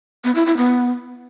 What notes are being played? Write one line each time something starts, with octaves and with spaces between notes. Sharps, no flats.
B3
E4
E4
B3